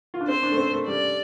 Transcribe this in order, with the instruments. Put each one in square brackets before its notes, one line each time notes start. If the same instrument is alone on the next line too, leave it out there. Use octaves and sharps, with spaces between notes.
[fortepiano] F4
D4
[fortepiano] C4 [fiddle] C5
[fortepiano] D4
A3
C4
A3
[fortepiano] G3 [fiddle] D5